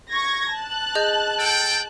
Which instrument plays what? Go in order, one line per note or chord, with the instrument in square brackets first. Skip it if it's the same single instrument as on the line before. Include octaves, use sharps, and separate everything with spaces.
[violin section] C#6 G#6 A#6
A5 F#6
[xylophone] G#4 D#5 G6
[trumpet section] A4 G5